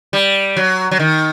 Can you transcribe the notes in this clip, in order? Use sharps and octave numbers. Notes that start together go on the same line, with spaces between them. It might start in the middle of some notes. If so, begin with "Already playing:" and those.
G3
F#3
F#3
D#3